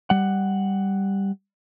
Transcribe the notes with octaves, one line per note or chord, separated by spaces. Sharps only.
G3 F#5